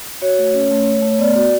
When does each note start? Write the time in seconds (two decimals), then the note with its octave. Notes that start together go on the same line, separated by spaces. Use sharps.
0.22 F#4 C#5
0.38 A3
0.54 C#4
0.71 A3
0.86 A3
1.02 A3
1.11 C#5
1.19 B3 D5
1.36 F#4 D5